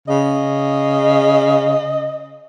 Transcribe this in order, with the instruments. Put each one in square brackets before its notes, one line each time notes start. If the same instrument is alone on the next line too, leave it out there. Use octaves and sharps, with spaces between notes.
[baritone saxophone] C#3 [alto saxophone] D#5